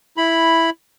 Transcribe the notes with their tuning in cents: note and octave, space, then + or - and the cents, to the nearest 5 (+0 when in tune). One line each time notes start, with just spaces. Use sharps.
E4 +0 B5 +0